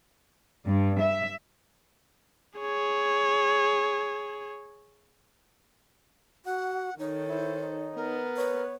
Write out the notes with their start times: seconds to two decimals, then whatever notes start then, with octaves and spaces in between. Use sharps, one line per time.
0.66 G2
1.01 E5
2.59 G#4 C#5
6.46 F#4 F#5
6.99 D#3 D#4 A4 C#5
7.29 E4 C5
7.62 D#4
7.96 B3 A#4
8.37 B4 C#5